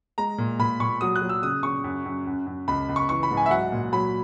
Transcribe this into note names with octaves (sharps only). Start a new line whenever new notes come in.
G#3 A#5
A#2
A#2 B5
A#2 C#6
F#3 D#6
F#6
F#3
E6
C#3 D#6
C#3 C#6
F#2
F#2
F#2
F#2
C#2 B5
C#2
C#6
E3 C#6
B5
G#2
G#5
E5
F#3 F#5
A#2
F#3 B5